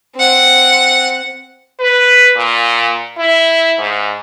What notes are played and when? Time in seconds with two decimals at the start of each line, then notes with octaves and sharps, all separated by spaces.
0.16 C4 F#5
1.80 B4
2.36 A#2
3.18 E4
3.79 G#2